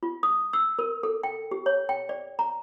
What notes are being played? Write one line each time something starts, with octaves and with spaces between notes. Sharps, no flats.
F4
D#6
E6
A#4
A4
G5
G4
C#5
G5
D5
A#5